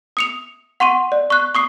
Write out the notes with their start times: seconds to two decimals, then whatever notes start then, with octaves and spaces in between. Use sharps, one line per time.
0.17 D#6 C#7 F7
0.80 F#5 C6 C#6 D#7
1.12 D5
1.30 C#6 F#6
1.55 C#6 D#6 C7